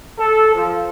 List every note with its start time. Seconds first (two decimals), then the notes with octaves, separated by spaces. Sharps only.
0.19 A4
0.54 F3